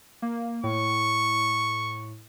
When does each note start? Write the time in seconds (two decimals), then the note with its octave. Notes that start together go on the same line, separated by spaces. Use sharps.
0.22 A#3
0.64 A2 C#6